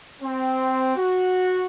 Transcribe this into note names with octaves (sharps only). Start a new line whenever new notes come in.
C4
F#4